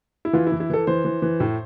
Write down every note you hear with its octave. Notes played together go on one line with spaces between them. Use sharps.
E4
E3 F4
E4
E3
E4
E3 A4
E3 C5
E3
E3
A2